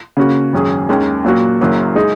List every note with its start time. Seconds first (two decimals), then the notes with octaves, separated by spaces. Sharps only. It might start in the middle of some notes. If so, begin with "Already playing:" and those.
0.17 C#3 A#3 C#4 F#4
0.53 G#1 F#2 F#3 C#4 G#4
0.89 D#2 D#3 G#3 C#4
1.24 A#2 F#3 A#3 F#4
1.61 F#1 F#2 F#3 A#3
1.95 G#3 D#4 G#4